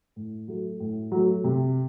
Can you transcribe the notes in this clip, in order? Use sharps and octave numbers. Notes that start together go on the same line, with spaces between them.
A2
F#3 A3
A2
F#3 A3
C3